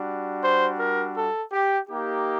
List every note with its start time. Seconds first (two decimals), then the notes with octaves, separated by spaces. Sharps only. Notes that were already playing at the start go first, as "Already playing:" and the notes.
Already playing: G3 D4 F#4
0.42 C5
0.79 A#4
1.16 A4
1.52 G4
1.89 A#3 D#4 G4